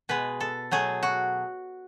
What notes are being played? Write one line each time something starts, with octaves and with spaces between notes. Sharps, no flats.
B2 G#3 B4
A4
B2 F#3 A3 G#4
F#4